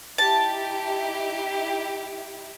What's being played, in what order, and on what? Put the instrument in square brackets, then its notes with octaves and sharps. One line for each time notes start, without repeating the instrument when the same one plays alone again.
[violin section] D#4 E4 G4 [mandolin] A5